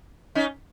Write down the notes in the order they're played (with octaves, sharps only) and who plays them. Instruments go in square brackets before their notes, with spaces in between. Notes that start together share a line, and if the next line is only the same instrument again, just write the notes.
[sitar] C#4 D#4